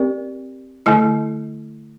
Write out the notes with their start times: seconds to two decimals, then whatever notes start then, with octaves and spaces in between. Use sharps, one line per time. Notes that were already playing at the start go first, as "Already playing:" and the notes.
Already playing: C4 G4 A#4 D5
0.86 D3 A3 E4